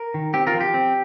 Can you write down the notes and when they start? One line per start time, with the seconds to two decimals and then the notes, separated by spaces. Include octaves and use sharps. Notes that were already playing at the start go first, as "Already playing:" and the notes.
Already playing: A#4
0.14 D#3
0.34 C4 G4
0.47 F4 A#4
0.54 F3
0.61 G4
0.74 C4